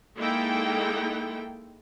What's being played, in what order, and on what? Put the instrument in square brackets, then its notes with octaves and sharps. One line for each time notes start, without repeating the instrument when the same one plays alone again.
[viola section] G#3 A#3 D#4 E4 A4 G5